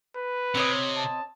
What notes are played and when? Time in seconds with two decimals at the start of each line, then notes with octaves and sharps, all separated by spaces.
0.16 B4
0.55 C3 C4 C#5 D#5
0.96 A5